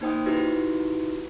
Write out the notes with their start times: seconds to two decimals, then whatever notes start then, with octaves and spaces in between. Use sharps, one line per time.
0.01 A#3 D#4 C5 G5 D#6
0.26 D#4 E4 F#4 G4 B4